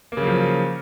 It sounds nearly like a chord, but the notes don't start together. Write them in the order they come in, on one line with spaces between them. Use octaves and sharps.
A#3 C#3 F#3 F3